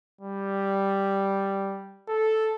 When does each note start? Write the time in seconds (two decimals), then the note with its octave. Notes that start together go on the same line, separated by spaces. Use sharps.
0.21 G3
2.08 A4